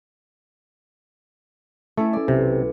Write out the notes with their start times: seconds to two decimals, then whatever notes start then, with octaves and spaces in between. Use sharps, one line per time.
1.97 A3 C#4 E4 A4
2.13 D5
2.28 B1 C3